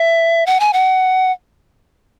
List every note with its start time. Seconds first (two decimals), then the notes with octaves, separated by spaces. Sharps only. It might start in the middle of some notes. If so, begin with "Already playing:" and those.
Already playing: E5
0.46 F#5
0.60 G#5
0.73 F#5